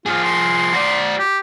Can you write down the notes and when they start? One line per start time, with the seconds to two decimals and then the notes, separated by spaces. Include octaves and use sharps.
0.06 F3 F4 G#4
0.24 C6
0.73 F#4 D5
1.19 G4